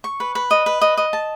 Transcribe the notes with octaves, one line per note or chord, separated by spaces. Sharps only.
C#6
B4
B4
D#5
B4
D#5
D#5
A5